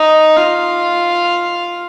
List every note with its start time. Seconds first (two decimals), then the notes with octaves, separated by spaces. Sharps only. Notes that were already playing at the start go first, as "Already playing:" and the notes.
Already playing: D#4
0.36 F4